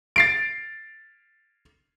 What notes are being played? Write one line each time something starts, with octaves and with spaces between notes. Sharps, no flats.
A6 C7 D7